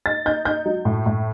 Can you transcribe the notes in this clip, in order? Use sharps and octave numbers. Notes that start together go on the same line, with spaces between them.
D#4 A6
D#4 G6
D#4 G6
F#3
A2
A2